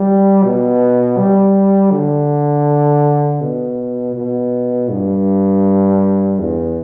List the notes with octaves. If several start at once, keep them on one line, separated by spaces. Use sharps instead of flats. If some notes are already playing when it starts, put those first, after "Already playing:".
Already playing: G3
B2
G3
D3
B2
B2
G2
E2